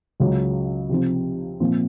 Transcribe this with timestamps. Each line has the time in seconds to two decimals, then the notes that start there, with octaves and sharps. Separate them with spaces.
0.20 C#2 C#3 F#3
0.89 C3 F3 C4
1.60 A#2 F3 C4